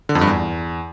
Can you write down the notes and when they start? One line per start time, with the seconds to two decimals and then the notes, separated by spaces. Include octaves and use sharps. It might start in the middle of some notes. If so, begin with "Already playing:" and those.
0.09 D3
0.15 F2
0.21 G2
0.27 E2